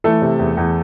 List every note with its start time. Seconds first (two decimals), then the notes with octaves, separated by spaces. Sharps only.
0.04 E3 A3 A4
0.22 C3
0.39 E2
0.57 E2